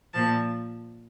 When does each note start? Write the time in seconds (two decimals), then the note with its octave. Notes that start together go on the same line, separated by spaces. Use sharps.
0.14 A#2 F3 A5